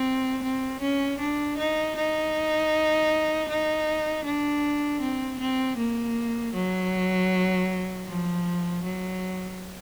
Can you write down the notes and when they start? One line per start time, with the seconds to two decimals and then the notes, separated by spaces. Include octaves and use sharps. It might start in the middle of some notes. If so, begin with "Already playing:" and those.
Already playing: C4
0.43 C4
0.81 C#4
1.19 D4
1.58 D#4
1.96 D#4
3.49 D#4
4.25 D4
5.01 C4
5.40 C4
5.78 A#3
6.54 F#3
8.06 F3
8.83 F#3